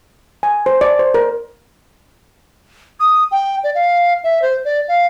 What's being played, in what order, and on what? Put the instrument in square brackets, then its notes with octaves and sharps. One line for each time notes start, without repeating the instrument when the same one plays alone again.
[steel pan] G#5
C5
D5
C5
A#4
[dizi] D#6
G5
D5
F5
E5
C5
D5
F5